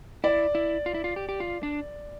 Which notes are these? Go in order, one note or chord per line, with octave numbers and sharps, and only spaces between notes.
E4 D5
E4
F4
E4
F4
G4
G4
F4
D4